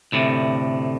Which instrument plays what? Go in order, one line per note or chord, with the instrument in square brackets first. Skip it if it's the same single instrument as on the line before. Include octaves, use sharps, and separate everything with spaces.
[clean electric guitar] D2 A2 C3